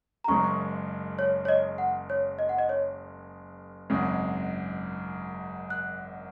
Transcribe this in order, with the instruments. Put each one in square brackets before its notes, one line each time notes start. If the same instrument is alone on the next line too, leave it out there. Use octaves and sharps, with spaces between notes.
[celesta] A#5
[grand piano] F#1 F#2 C#3 G#3 [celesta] C#6
[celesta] C#5
C#5
D#5
F#5
C#5
D#5
F#5
D#5
C#5
[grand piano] G#1 F#2 C#3 G#3
[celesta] F#6